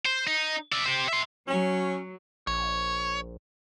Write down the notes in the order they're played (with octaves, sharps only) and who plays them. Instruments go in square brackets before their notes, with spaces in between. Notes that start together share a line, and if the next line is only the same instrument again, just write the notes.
[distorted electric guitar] C5
D#4
D5 E5
G4 C5
E5 C6
[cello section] F#3 [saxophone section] C#4
[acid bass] A#1 [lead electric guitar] C#5